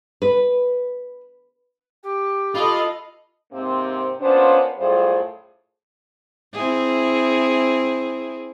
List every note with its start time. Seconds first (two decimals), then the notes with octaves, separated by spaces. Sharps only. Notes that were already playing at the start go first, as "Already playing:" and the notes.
0.22 B4
2.03 G4
2.55 F4 A4 D#5 B5
3.51 G#2 C3 A#3 C4
4.21 A#3 B3 C#4 D4 F4 C5
4.78 F#2 A2 G3 F4 G#4 C5
6.53 C4 E4 G#4